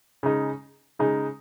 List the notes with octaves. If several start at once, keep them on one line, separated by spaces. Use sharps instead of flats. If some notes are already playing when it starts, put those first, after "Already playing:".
C#3 G#3 D#4
C#3 G#3 D#4